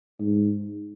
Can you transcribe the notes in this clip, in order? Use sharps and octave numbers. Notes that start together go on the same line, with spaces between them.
G#2